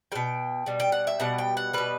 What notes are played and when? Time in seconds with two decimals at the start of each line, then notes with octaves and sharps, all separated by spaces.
0.12 G3 G5
0.15 B2
0.66 B2 G3
0.80 G5
0.92 F#5
1.07 E5
1.20 B2 G3 F#5
1.38 G5
1.57 F#5
1.73 B2 G3 B4